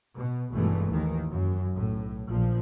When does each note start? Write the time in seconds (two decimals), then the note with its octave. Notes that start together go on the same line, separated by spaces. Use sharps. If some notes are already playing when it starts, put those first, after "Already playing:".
0.17 B2
0.53 G#1 G2 B2 E3 G#3 A3
0.90 D#2 D#3 E3
1.31 F#2
1.75 B1 A2
2.28 A#1 A#2 F3